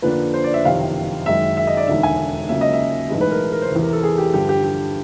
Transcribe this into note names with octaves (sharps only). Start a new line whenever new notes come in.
F2 D3 F3 A#3 D4 B4
C5
D5
E5
F#1 F2 C3 D#3 F5
F#1 F#2 D#3 G#3 E5
E5
D#5
D5
E1 D#2 D3 E5
G#5
C#2 C#3 F#3 A#3 E5
D#5
E5
B1 A2 E3 G#3
B4
A#4
A#4
C5
E2 C3 E3
A#4
A4
G#4
G4
G2 D3 F3 G4
G4
G4